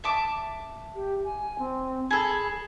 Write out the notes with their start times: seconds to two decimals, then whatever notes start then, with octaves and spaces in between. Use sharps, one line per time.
0.04 E5 A5 D6
0.95 G4
1.24 G#5
1.59 C4
2.11 G#4 A4 B5